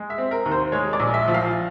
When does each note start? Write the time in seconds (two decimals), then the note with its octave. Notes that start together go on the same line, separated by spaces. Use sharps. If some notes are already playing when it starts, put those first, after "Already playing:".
Already playing: G#3
0.10 E5
0.18 C4
0.31 A#4
0.45 D#2
0.51 C5
0.72 G#3 C#5
0.93 D5
1.00 A#1
1.14 E5
1.28 F3
1.34 F5